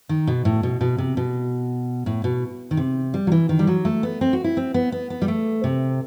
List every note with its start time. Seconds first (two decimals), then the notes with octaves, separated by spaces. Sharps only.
0.09 D#3
0.27 B2
0.45 A2
0.63 B2
0.81 B2
0.98 C3
1.17 B2
2.06 A2
2.24 B2
2.71 D#3
2.77 C3
3.14 G3
3.27 F#3
3.32 E3
3.49 D#3
3.59 G3
3.67 F#3
3.85 A3
4.03 B3
4.21 C4
4.33 F#4
4.44 E4
4.57 C4
4.74 B3
4.92 B3
5.10 B3
5.22 G3
5.28 A3
5.64 C3